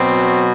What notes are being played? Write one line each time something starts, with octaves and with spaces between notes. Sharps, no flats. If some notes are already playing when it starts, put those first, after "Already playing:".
Already playing: B2 F#3 C4